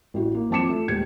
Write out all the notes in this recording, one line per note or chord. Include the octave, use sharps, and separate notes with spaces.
A1 F#4
A#3
F2 F3 A5 D6 C#7 E7
A3
D#1 G#3 G#6 C#7